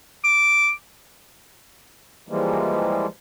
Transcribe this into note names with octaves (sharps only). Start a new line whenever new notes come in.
D6
E3 F3 G3 G#3 A#3